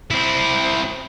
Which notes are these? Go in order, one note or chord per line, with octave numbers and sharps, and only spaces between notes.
C4 E4